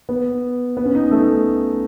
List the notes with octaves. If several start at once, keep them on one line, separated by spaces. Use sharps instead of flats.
B3
B3
C#4
D#4
A3